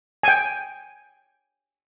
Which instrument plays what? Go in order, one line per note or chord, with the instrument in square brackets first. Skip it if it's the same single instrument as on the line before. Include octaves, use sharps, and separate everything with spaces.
[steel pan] G5 G#5